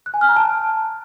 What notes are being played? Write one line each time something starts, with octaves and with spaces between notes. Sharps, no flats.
F#6
G#5
F6
A#5
A5